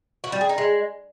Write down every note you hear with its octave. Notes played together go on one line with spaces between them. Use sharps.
F#4
G3
G#4
D#4
G#3